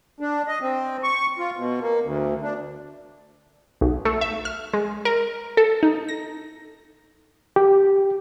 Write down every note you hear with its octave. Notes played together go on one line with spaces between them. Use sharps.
D4
D#5
C4
C#6
F4
B2
A#3
D2
D4
B1
A3
E5
F6
G#3
A#4
A4
D#4
A#6
G4